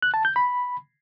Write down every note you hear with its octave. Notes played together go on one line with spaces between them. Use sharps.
F#6
A5
G6
B5